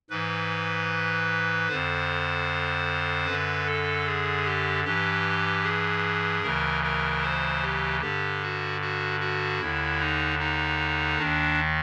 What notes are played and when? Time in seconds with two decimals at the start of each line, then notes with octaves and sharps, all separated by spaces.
0.10 G#2 E3 B4
1.69 F2 D3 C5
3.26 F#2 D3 B4
3.66 A4
4.06 G#4
4.45 G4
4.84 G2 E3 G4
5.64 G#4
6.43 D2 C#3 E3 A#4
6.83 A#4
7.23 C5
7.62 G4
8.01 G2 D3 G4
8.42 F#4
8.81 F#4
9.20 F#4
9.60 D#2 D3 E4
10.00 D#4
10.39 D#4
11.18 D#2 D#3 D4